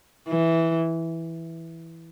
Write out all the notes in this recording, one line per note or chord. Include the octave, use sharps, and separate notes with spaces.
E3